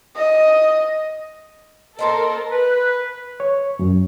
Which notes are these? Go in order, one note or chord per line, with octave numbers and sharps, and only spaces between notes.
D#5
A#3 A4 A#4 C5 D#5
B4
C#5
F#2